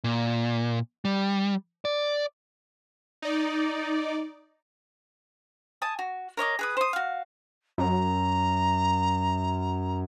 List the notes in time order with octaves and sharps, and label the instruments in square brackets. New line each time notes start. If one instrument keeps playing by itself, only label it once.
[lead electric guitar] A#2
G3
D5
[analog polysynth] D#4 D5
[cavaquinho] G#5 A5 D#6
F#4
A#4 C#5 D#5 D6
G#4 B4 D#6
C5 D#6
F#4 F5
[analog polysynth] F#2 [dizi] A#5